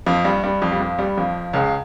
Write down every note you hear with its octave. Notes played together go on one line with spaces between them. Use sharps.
F2 F3
G2 G3
G2 G3
F2 F3
G3
F2 F3
G2 G3
F2 F3
C#2 C#3